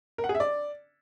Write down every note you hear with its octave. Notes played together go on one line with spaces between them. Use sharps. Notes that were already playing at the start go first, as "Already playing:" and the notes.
A#4
F#5
G#4
E5
D5